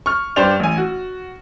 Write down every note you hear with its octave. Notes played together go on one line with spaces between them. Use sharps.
C#6 F6
G2 G4 C5 D5 G5 F7
A1 G#5
F#4